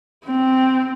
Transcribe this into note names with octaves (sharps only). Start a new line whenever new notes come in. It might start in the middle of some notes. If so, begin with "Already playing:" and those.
C4